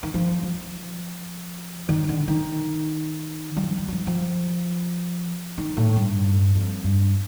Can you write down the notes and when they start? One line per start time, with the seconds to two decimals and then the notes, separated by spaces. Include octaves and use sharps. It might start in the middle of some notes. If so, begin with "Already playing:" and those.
0.03 D#3
0.14 F3
0.43 F3
1.89 D#3
2.09 D3
2.28 D#3
3.56 G3
3.63 F3
3.78 G3
3.88 G3
3.93 F3
4.07 F3
5.58 D#3
5.77 A2
5.96 G2
6.55 F2
6.84 G2